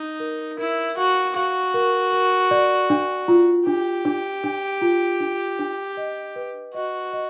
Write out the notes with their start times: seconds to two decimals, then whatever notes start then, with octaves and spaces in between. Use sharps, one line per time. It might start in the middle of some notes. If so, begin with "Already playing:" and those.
Already playing: D#4
0.20 A#4
0.58 E4 A#4
0.97 F#4 F5
1.36 F#4 F5
1.74 A#4
2.13 A#4
2.51 D5
2.90 D4
3.28 F4
3.66 D4 G4
4.05 D4
4.44 D4
4.82 F4
5.20 D4
5.59 D4
5.97 D#5
6.36 B4
6.74 F#4 D#5
7.13 D#5